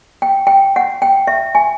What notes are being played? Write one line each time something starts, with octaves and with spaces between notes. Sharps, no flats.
G5
G5
F#5
G5
E5
G#5